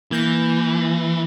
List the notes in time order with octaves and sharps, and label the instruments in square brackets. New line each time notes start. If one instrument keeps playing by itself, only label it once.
[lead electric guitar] E3 [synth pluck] A#3 G6 A#6